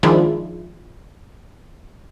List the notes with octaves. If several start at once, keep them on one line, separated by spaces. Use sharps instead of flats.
D#3 F3 G#3 D4 E4 F4